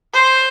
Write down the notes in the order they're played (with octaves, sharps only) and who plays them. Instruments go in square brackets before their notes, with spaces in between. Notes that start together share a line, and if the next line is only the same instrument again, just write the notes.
[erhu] C5